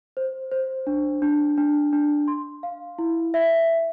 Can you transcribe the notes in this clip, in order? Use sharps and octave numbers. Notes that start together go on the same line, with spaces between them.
C5
C5
D4
D4
D4
D4
C6
F5
E4
E5